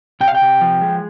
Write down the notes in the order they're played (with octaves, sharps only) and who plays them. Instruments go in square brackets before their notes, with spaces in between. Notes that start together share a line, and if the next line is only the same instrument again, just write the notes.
[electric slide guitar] C3 G5
F5
G5
C3
F3
G#3